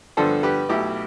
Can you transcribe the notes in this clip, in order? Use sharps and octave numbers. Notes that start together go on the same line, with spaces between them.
G2 D3 F3 B3 A4 C5
G4 B4
B1 B2 A3 E4 G4